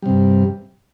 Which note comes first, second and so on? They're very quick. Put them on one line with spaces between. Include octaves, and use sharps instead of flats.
G3 C3 G2